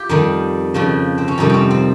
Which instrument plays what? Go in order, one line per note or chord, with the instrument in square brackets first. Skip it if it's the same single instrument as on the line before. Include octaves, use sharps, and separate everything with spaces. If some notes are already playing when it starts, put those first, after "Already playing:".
Already playing: [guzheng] F4 G4
F2 D#3 G3 D#4
F2 C#3 F3
C4
C#4
F2 C3 D#3 G3 D#4
C4 C#4
C4